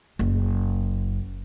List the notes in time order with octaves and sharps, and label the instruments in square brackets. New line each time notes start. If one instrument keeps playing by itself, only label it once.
[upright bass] F#1